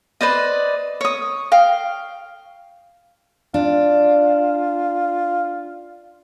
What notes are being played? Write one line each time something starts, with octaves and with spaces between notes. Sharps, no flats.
B4 C5 D5 D#5
C#5 D#6
F5 G5
D4 F4